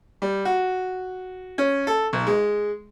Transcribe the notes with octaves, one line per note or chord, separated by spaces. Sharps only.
G3
F#4
C#4
A4
B1
G#3